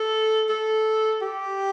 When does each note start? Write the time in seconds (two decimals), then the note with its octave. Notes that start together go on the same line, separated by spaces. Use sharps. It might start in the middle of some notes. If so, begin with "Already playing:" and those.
Already playing: A4
0.49 A4
1.21 G4